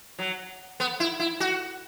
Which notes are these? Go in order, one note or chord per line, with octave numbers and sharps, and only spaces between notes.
F#3
B3
E4
E4
F#4